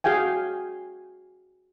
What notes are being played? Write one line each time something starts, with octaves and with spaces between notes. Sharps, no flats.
F#4 G#4 F5 G5 G#5